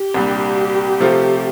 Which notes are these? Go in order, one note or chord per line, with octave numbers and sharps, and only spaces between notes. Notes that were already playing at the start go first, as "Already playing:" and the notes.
Already playing: G4
C2 A#2 G3 D4
C3 F3 A3 C4 F4